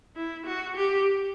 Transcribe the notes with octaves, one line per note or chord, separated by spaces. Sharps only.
E4
F#4
G4